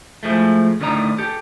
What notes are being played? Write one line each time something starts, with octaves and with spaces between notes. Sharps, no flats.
A2 F3 G#3 A3
D2 A2 D#3 D4 D#5 A#5
G4 A4